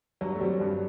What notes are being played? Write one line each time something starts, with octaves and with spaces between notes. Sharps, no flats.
G2 F#3
A3
F#3 G3 C4
G2